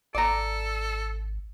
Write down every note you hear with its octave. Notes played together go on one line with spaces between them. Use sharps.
G#1 A4 D5 A#5